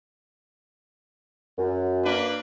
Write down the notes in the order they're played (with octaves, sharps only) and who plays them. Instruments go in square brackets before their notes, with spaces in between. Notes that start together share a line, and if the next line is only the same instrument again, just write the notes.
[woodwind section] F#2
[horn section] A#3 D4 B4